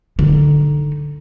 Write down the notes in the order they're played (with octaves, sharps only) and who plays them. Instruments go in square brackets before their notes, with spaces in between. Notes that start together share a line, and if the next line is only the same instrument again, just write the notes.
[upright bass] D3 D#4